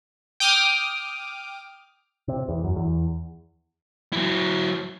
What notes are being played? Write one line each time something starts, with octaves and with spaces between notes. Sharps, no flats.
G5 D6 D#6 F6
C3
E2
F#2
E2
F#3 E4